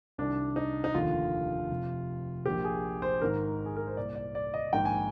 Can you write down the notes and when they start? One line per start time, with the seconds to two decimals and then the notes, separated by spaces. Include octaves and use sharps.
0.18 C2 C3 D#3 D4
0.56 D#4
0.84 D#4
0.95 F1 D#2 D3 F4
1.70 F1 F2 C3
2.45 A#1 A#2 G4
2.64 G#4
3.02 C5
3.21 G#1 G#2 D#3 A#4
3.66 G#4
3.76 A#4
3.87 C5
3.97 C2 A#2 D5
4.15 D5
4.35 D5
4.54 D#5
4.73 A#1 G#2 D#3 G5
4.85 G#5